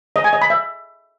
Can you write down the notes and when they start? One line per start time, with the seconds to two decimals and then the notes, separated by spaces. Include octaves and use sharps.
0.16 D#5
0.24 G#5
0.33 D#5
0.42 B5
0.50 E5